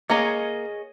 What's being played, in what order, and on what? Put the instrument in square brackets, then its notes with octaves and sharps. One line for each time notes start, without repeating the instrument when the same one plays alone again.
[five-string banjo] A#3 A#5 [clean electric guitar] G#4 C#5 D#5